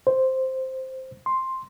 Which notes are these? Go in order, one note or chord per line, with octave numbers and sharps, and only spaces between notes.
C5
C6